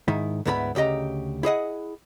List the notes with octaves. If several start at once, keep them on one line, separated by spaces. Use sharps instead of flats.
G#2 D#3 E4
D2 G#2 B3 E4 A#5 B5
D2 C#3 G4 D#5 A#5
E4 G#4 D#5 F#5